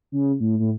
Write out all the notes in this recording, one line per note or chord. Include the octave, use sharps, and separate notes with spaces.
C#3
A2
A2